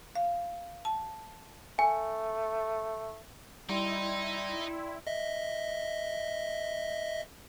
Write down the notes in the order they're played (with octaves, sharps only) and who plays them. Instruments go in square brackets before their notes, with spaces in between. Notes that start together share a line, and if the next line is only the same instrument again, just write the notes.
[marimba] F5
A5
[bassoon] A3 [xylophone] G#5
[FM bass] G3 [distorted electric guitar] D#4 [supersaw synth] E4 [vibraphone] D5 G5 C6
[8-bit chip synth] D#5 E5